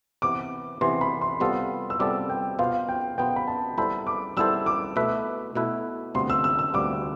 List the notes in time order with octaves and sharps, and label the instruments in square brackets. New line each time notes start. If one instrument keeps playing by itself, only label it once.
[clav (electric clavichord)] C3 E3 B3 [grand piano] D6
[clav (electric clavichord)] C3 E3 B3 [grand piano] C6
[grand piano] B5
C6
[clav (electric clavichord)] C3 G3 B3 F4 A4 [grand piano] C6
[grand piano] E6
[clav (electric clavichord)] C3 G3 B3 F4 A4 [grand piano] D6
[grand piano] G5
[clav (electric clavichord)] B2 B3 F4 C5 [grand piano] F5
[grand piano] G5
[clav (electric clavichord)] B2 B3 F4 C5 [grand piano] G5
[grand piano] B5
A5
[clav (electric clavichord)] G3 B3 E4 A4 C5 [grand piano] B5
[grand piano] D6
[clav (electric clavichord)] G3 B3 E4 A4 C5 [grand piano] E6
[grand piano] D6
[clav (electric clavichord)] B2 A3 E4 B4 E5
B2 A3 E4 B4 E5
[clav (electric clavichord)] D2 C3 G3 B3 F4 [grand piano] C6
[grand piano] E6
E6
E6
[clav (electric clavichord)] D2 C3 G3 B3 F4 [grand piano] D6